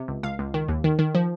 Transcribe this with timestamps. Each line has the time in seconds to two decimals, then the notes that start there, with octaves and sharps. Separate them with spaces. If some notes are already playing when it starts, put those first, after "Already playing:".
Already playing: C3
0.08 C#2
0.23 C#2 F5
0.39 C#2
0.54 D#3
0.68 D#2
0.84 D#3
0.99 D#3
1.15 F3